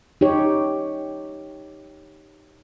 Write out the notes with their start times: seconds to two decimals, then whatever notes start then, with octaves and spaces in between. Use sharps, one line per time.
0.21 D#4 G4 C#5